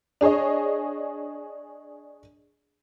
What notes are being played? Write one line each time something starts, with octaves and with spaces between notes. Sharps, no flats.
D4 G#4 C#5 D#5